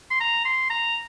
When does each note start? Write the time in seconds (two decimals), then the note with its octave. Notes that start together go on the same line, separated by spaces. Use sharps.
0.11 C6
0.20 A#5
0.45 C6
0.70 A#5